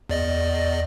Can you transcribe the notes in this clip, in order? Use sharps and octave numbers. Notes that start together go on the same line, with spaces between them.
E2 D5 D#5